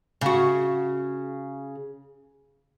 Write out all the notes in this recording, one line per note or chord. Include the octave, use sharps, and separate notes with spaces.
C#3 F#4